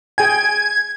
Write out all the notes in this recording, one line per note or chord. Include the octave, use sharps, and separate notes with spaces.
G#4 G5 G#5 G#6